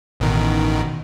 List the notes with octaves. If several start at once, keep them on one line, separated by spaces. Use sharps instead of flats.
A1 B2 D#3